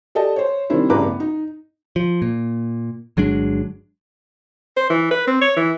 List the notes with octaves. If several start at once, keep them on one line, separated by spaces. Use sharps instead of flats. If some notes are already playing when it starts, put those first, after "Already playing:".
G4 A4 D5 D#5 A5
C5 C#5
C3 D#3 G3 D4 E4 C5
A1 G2 C#3 B4 A#5 D6
B3
D#4
F3
A#2
G1 F#3 G#3 D4
C5
E3
B4
C4
C#5
E3